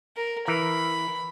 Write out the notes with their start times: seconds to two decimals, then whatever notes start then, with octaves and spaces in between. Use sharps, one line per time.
0.16 A#4
0.48 E3 A#4 B5